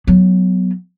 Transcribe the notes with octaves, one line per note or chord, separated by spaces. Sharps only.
F#3 B3